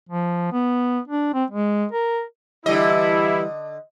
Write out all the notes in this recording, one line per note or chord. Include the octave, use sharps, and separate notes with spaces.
F3
B3
D4
C4
G#3
A#4
D3 E3 G3 E4 D#5